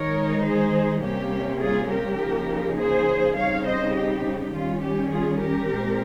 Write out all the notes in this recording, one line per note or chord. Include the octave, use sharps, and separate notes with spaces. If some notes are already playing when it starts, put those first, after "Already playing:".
Already playing: D#3 G#3 D#4 A#4 C#5
G#4 C5
C3 G3 A#3 C#4 G4
F4 G#4
G4 A#4
C#3 F3 A#3 D#4
G#4 C5
C#3 G3 C4 D#4 C#5 F5
C5 D#5
G4
D#3 G3 C#4 F4
G4
F4 G#4
G4 A#4
A#2 G#3 C4